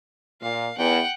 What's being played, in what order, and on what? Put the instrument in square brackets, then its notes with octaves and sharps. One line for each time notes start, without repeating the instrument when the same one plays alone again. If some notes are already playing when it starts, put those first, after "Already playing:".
[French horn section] A#2 [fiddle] F5
[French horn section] E2 [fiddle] F#5 G5